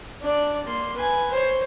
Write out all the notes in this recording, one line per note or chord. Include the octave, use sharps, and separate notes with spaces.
D4 D5
A#3 C6
B4 G#5
C5 C#5